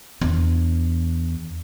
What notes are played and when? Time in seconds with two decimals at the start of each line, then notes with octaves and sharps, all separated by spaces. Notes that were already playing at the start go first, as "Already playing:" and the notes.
0.21 E2 D4